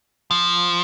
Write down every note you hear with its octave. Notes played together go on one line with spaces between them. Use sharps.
F3